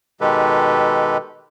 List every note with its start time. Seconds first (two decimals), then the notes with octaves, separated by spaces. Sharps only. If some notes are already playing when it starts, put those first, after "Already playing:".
0.21 B2 D#3 G#3 G4 A4 B4